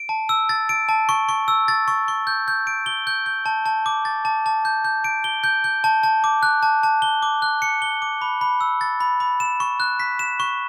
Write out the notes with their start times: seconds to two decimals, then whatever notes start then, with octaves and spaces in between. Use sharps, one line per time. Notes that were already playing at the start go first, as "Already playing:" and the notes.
Already playing: D7
0.09 A5
0.29 E6
0.49 A6
0.69 D7
0.89 A5
1.09 C#6
1.29 C#6
1.48 E6
1.68 A6
1.88 C#6
2.08 C#6
2.27 G6
2.48 G6
2.67 D7
2.86 G7
3.07 G6
3.26 G6
3.46 A5
3.66 A5
3.86 D6
4.05 A6
4.25 A5
4.46 A5
4.65 G6
4.84 G6
5.04 D7
5.24 G7
5.44 G6
5.64 G6
5.84 A5
6.03 A5
6.24 D6
6.43 F#6
6.63 A5
6.83 A5
7.02 G7
7.23 D6
7.42 F#6
7.62 C#7
7.82 G7
8.02 D6
8.22 B5
8.41 B5
8.61 E6
8.81 A6
9.00 B5
9.20 B5
9.40 E7
9.60 C#6
9.80 F#6
10.00 B6
10.19 E7
10.40 C#6